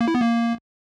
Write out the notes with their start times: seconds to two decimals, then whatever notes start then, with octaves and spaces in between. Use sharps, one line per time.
0.01 A#3
0.08 E4
0.15 B3
0.22 A#3